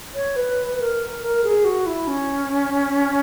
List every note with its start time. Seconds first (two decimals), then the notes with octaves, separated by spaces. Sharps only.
0.15 C#5
0.36 B4
0.80 A#4
1.22 A#4
1.44 G#4
1.65 F#4
1.86 E4
2.07 C#4